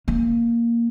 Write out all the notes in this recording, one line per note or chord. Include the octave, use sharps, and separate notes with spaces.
A#3